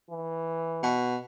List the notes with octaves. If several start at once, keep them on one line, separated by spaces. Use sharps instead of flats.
E3
B2